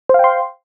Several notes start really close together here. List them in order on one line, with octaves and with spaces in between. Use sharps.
C5 F5 G5 C6